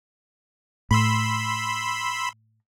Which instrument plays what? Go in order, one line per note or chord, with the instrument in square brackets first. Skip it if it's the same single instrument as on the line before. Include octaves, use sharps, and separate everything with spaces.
[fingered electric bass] A2 [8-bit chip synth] B5 C6 E6